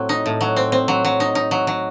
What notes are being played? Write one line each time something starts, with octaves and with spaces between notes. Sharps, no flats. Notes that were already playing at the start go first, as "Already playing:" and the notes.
Already playing: A2 F#3 C4
D#4
A2
F#3
C4
C4
F#3
F#3
D#4
D#4
F#3
F#3